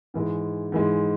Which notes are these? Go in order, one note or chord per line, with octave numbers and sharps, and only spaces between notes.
G#2 E3 G#3
G#2 E3 G#3